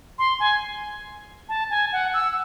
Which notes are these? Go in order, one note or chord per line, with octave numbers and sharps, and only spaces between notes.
C6
G#5
A5
G#5
F#5
E6